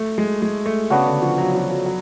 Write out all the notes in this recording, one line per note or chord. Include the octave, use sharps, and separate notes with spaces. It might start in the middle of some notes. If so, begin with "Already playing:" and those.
Already playing: A3
G#3
G#3
A3
C#3 B3 D4 F#4 C#5
D3
F3
F#3
F3
F#3
F#3